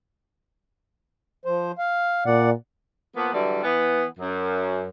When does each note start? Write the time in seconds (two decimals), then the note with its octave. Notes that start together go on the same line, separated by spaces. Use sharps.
1.45 F3 C5
1.78 F5
2.26 A#2 D5 F#5
3.16 F3 A#3 B3
3.33 D3 E3 F#3 G3
3.63 E3 B3
4.19 F#2